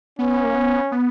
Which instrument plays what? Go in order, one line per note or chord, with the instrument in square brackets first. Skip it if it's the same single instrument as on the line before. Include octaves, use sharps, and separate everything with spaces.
[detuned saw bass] B3 [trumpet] C#4
[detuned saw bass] A#3
B3
B3